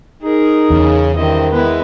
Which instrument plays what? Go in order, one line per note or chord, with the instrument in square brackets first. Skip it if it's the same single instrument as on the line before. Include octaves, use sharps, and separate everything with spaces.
[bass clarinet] D#4 [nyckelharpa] G#4 A#4
[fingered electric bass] E2 [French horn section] C#3
[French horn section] G2 C4 E4 [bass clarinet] D#3 [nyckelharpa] D#5
[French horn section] G#3 E4 [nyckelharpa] B3 B4